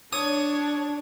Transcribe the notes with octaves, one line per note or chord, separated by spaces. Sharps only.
D4 C#5 D#6